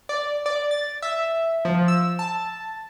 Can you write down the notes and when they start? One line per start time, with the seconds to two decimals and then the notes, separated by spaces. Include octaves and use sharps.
0.09 D5
0.46 D5
0.71 A6
1.02 E5
1.65 F3
1.88 E6
2.19 A5